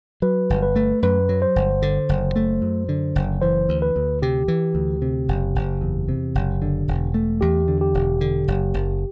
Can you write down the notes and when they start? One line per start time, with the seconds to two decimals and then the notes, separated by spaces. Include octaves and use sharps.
0.22 F#3 B4
0.50 G1
0.63 B4
0.76 A3
1.03 F#2 B4
1.29 F#3
1.42 C5
1.56 G1
1.82 D3
2.09 F#1
2.36 A3
2.62 F#2
2.89 D3
3.15 F#1
3.42 E3 C5
3.69 D2
3.82 B4
3.96 D2
4.22 C3 G4
4.48 E3
4.75 D2
5.02 C3
5.28 F#1
5.55 F#1
5.81 E2
6.08 C3
6.35 F#1
6.62 D3
6.88 E1
7.14 A3
7.41 E2 G4
7.68 D3
7.81 G4
7.94 E1
8.21 D3
8.48 F#1
8.74 F#1